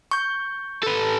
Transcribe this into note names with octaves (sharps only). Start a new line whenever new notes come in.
C#6 G6
A4 B4